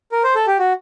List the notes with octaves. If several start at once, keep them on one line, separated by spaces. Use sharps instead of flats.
A#4
C5
A4
G4
F#4